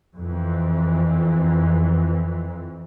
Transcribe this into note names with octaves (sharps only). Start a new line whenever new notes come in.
F2 E3